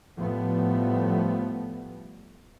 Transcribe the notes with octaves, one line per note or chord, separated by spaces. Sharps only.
A2 F3 G3 A3 B3